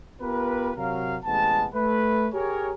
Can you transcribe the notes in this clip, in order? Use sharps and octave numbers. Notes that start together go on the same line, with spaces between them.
B3 F4 G4 A#4 B4
C3 F#3 A#4 F5
A1 C3 G#3 B3 A5
A3 B4
G4 G#4 A#4 C#5